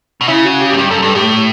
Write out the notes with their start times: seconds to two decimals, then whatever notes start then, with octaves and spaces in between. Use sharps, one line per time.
0.21 B2
0.28 C#3 E4
0.45 F#4
0.61 G4
0.73 F#2
0.78 G2 G4
0.90 F#2 A4
1.02 G2 A4
1.15 A2 G4